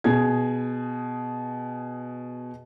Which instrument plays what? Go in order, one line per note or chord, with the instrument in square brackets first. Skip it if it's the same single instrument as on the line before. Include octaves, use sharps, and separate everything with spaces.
[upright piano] B2 G#4 G#6